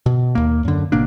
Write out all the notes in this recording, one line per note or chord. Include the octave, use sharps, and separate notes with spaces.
B2
D#2 A#3
F#2 D3
G#1 B2 A#3 D4